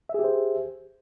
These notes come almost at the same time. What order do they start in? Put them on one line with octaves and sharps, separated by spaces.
E5 G#4 G4 C5